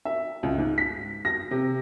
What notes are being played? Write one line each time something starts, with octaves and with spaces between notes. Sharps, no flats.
E5
C#2
G#2
B6
A#6
C3